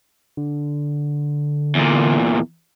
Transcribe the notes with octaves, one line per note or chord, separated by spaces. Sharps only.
D3
E2 A#2